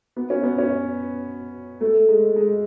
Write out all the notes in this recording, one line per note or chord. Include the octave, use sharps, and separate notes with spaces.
B3
C#4
B3
C#4
A3
G#3
G#3